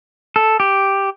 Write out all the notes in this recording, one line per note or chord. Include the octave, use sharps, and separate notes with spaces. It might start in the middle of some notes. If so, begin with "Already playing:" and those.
A4
G4